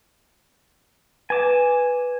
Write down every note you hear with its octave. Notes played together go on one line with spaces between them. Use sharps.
B4 G#5 D6 E7